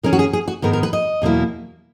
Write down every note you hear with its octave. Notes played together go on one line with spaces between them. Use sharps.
D#3 G#3 C#4 A#4
F#4
G#4
G#4
F#4
G#2 D#3 G#3 B3 A#4
A#4
B4
D#5
E2 B2 F#3 A#3 E4